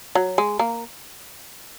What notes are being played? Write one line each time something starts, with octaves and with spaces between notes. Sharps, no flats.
F#3
G#3
A#3